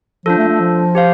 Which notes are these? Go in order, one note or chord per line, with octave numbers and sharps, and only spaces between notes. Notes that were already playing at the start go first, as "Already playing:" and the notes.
F3 D4 F4 A4
A3
A3
F3
G4 C5 F5